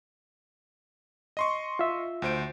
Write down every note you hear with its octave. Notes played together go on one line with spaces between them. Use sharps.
D#5 C6 C#6
F4 E5
D2 C5 D7